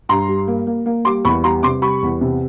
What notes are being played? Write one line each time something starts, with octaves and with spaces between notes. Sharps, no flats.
G2 A#5 C6
G3
A#3
A#3
A#3
G3 C6 D6
E2 B5 C#6
G3 A#5 C6
C3 C6 D6
G3 B5 C#6
E2
C3